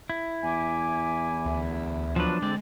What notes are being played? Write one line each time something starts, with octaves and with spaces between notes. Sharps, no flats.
E4
E2 G#5 D6
D2
F3 F#3 D4 B4
D3 G#3 C4 D5